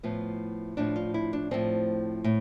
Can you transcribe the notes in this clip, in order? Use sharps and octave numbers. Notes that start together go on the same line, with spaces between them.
A2 F3 B3
A2 F3 D4
F4
E4
D4
A2 F3 C4
A2